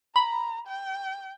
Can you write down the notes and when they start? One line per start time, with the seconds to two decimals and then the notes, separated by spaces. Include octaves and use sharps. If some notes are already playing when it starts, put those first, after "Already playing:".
0.16 A#5 B5
0.68 G5